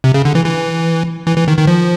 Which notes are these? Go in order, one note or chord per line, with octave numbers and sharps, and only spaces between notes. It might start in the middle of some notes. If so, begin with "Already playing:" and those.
C3
C#3
D3
E3
E3
E3
E3
D#3
D#3
F3